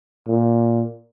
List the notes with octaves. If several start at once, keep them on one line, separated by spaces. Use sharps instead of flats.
A#2